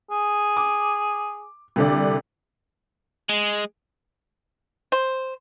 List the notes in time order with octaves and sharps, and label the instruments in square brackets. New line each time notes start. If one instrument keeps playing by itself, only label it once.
[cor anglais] G#4
[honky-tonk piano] D6
C2 D3 D5
[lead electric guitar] G#3
[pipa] C5